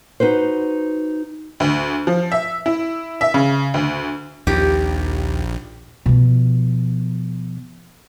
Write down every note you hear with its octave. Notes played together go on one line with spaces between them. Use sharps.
D#4 F#4 B4 C5
D2
F3
E5
E4
E5
C#3
D2
A#1 D#2 G4
B2 F3